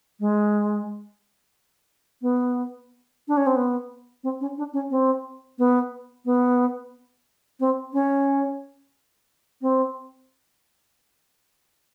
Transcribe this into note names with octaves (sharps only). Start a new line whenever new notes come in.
G#3
B3
D4
C#4
C4
B3
C4
C#4
D4
C#4
C4
B3
B3
C4
C#4
C4